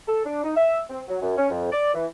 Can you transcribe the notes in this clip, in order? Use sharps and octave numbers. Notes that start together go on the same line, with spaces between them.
A4
D4
D#4
E5
C4
F#3
F#2
C#4
F2
D5
E3